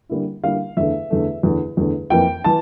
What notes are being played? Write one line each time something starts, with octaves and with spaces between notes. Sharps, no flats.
D3 G3 A#3 E4
D3 G3 A#3 E4 F5
E2 D3 A3 E5
E2 D3 A3
E2 D3 A3
E2 D3 A3
F2 E3 A#3 G5
E3 A5